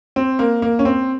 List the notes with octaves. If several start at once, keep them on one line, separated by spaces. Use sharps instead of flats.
C4
A#3
A#3
C#4
C4